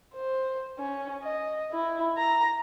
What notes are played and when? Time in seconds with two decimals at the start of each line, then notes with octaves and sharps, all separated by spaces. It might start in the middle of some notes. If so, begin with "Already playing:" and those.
0.14 C5
0.79 C#4
1.22 D#5
1.71 E4
2.17 A#5